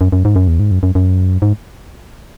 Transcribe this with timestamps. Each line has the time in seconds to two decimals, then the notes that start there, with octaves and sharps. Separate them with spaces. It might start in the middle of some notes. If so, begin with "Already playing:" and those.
0.01 F#2
0.12 F#2
0.25 G#2
0.36 F#2
0.48 E2
0.60 G#2
0.71 F#2
0.83 F#2
0.95 F#2
1.42 G#2